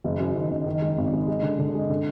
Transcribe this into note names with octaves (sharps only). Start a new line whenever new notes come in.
F#1
F#2
D#3
F#1
D#3
G#3
G#1
G#3
G#3
D3
D3
G#3
D3